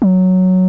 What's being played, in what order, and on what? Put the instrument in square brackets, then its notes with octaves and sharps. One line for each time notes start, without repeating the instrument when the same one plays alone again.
[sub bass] F#3